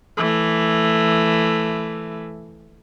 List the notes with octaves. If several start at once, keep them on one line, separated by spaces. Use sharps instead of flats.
E3 A3